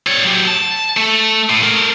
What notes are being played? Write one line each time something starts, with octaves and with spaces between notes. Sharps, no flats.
G3 C#5
F#3 G4
A5
A3
A2
A3 A#4